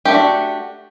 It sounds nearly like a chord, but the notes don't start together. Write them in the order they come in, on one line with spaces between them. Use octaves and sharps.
G4 A3 D4 F#4